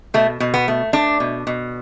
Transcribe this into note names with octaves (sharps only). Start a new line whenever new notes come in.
B2 A3
B2
B3
A3
A3 D4
B2
B2